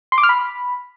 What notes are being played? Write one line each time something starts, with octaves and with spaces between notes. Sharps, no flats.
C6
D6
F6
B5